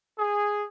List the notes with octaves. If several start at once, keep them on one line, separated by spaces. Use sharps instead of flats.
G#4